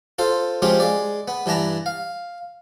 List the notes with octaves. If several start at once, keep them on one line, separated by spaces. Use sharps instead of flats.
F4 A4 C5
F3 G#3 C4 C#4 F4 G4
G#3 D5
B3
G2 E3 D4 A5 A#5
F5